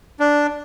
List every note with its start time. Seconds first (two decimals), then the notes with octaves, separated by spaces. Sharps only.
0.20 D4